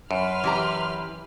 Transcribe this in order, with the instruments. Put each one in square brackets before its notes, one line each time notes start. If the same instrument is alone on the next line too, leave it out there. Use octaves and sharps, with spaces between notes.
[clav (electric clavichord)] F#2 [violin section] B4 C6 F6
[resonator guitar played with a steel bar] E3 G4 A#5